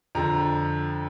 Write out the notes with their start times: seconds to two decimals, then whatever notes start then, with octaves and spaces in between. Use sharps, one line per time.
0.15 F2 D3 F3 A#5